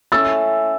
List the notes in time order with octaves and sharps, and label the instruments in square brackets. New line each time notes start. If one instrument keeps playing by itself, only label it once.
[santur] A3 C#4 E4 A4 [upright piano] E6 A6